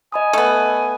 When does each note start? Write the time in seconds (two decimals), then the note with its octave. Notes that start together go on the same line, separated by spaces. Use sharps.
0.12 D#5 G#5 B5 D#6
0.33 A3 B3